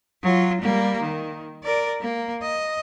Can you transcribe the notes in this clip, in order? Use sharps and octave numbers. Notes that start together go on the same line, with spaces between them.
F#3 F4
G3 A#3
D#3
A#4 D5
A#3
D#5